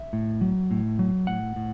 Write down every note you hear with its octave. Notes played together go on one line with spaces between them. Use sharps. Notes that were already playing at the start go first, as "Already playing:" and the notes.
Already playing: E5
A2
F#3
A2
F#3
A2 F#5
A2